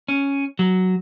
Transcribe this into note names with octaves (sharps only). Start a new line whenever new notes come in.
C#4
F#3